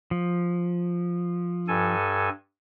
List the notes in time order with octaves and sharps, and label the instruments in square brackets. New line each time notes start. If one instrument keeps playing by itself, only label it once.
[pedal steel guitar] F3
[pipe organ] G2 A4 G#5